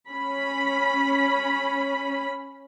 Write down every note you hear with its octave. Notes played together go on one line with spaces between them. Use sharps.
C#4 B5